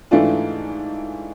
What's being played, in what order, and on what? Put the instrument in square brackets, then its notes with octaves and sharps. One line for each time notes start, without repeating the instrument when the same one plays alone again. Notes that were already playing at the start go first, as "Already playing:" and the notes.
[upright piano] G#2 E3 A3 D4 F4